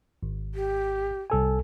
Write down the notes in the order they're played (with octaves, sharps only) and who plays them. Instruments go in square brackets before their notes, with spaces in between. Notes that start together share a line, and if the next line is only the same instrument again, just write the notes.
[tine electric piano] G#1
[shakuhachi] G4
[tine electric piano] C2 A4 G#5